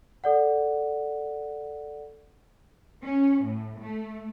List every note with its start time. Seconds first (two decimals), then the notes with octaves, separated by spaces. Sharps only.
0.24 A4 D5 F#5
3.03 C#4
3.43 A2
3.79 A3